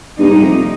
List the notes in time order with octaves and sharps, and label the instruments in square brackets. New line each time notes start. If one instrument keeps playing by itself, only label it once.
[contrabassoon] G2 [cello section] C3 G3 A#3 D#4
[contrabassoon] G#2
F2